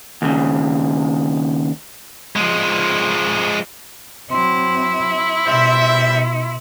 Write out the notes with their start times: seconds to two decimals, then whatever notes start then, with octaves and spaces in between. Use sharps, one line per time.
0.22 D#2 C#3
2.36 F3 G#3
4.31 F#3 C4 E4 C6
5.46 B2 G3 C5 E5